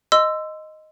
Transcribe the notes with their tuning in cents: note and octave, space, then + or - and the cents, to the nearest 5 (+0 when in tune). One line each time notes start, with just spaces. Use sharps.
D#5 +0 C6 -15 E6 +10